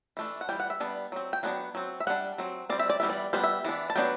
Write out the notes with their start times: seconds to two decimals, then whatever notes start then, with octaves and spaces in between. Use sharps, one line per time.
0.17 E3 A3 D4
0.41 F#5
0.49 E3 G3 G5
0.60 F#5
0.70 E5
0.80 G3 B3 D4
1.12 F#3 C4
1.33 G5
1.43 F#3 B3 D4 F#5
1.75 F#3 C4
2.00 E5
2.07 G3 D4 F#5
2.38 F#3 C4
2.69 G3 C4 D5
2.79 E5
2.90 D5
3.00 E3 G3 B3 E5
3.10 D5
3.33 G3 B3 D4 C5
3.44 E5
3.65 E3 B3 D4
3.90 A5
3.96 F#3 B3 D4 G5